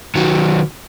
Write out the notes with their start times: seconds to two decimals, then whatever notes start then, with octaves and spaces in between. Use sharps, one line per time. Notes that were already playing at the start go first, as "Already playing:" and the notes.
0.15 D#3 F#3